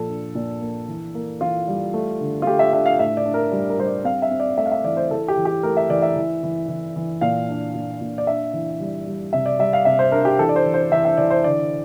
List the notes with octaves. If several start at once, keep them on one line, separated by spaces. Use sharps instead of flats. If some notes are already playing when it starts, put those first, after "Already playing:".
Already playing: A#2 F3 A4
D4
A#2
A#3
E3
A#3
E3 F4
G3
A3
D3
F4
A3 G4
E5
D4 E5
F5
A2 E5
D5
D4
A#4
G3
A#4
G3 C5
D5
C4 F5
E5
C4
D5
A3 E5
F5
E5
E3 D5
C5
E3 A4
G4
E3
G4
A3 A#4
E5
E3 D5
E5
E3
E3
E3
E3
A#2 F5
D4
A#2
A#2
D5
D4 E5
E3
G3
G3
C3 E5
D5
G3 E5
F5
C3 E5
C5
D4 A#4
G4
E3 A4
D5
C5
E3
C5
E3 E5
E5
E3 D5
C5
D3 D5